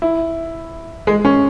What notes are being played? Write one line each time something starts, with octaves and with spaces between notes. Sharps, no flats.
E4
G#3
C#4